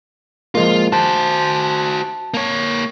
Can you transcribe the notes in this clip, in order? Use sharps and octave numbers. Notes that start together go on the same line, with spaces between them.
F3 G#3 A#3 F4
F#4 C5 A5
A#3 C#5